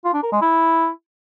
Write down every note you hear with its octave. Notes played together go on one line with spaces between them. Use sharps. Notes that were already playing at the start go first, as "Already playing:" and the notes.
F4
D4
A#4
G#3
E4